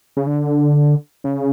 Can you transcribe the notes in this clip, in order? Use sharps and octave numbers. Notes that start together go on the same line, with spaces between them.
C#3
D3
C#3